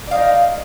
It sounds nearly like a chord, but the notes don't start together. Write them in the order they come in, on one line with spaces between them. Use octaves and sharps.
D5 F5 D#4